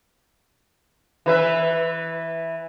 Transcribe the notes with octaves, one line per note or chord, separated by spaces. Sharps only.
E3 B4 E5